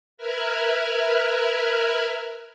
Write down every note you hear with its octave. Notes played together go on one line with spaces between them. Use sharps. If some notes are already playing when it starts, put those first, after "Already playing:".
A#4 B4 E5 F6 F#6 G#6